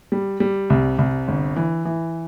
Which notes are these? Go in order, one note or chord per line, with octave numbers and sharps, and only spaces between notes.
G3
G3
C2
C2
G1
E3
E3